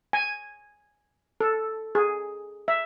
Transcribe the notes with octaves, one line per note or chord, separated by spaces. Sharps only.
G#5
A4
G#4
E5